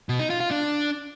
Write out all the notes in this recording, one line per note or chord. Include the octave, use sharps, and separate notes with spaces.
B2
D#4
F4
F4
D4